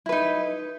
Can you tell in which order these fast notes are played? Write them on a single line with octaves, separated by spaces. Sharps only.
E4 B4 D#4